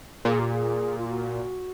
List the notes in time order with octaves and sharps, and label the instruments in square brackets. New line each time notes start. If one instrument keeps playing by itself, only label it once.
[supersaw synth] A#2 [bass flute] G#4
[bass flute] G4
G#4
F4
F#4